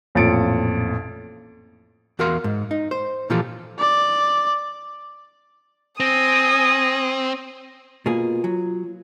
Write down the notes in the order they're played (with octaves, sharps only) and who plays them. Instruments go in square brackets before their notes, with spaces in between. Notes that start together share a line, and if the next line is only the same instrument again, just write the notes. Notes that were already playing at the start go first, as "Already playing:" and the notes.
[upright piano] A1 F2 A#2 A6 C#7 D7
[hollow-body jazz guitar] E2 F#4 A#4 F5 C6
G#2
D#4
C5
A#2 E3 F3 F4 G4 A4
[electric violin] D5
[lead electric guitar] C4 [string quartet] G#5 D#6 [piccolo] A#6
[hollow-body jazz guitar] B2 A#3 G#4 [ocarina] F4
[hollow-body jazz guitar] F#3